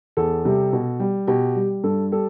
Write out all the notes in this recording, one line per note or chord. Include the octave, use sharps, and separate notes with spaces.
E2 A4
C3 G3
B2
G3
B2 G4
G3
G2 A4
G3 A4